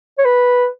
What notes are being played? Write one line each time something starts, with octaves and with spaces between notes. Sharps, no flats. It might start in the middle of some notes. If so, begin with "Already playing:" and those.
C#5
B4